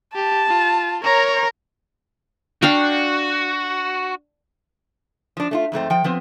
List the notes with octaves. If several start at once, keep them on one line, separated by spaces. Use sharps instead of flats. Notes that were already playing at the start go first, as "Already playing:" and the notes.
G4 A5
F4
A#4 C#5 A#5
D4 F#4 F5 G5
F3 D4
A3 D4 F4
F2 G#2 A3 C4
F3 G5
F3 B3 C4